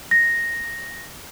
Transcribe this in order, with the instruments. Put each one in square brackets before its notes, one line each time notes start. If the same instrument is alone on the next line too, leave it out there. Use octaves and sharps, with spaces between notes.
[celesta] A#6